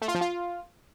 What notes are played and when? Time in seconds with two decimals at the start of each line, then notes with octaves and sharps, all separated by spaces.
0.02 A3
0.08 F4
0.15 F3
0.21 F4